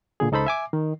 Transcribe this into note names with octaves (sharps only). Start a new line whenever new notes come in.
A#2 D3 G#4
C#2 D#4 A4 C5 B5
E5 G#5 D6
D#3